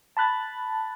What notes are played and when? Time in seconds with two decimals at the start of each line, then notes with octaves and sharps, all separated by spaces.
0.17 A5 B5 F#6 A6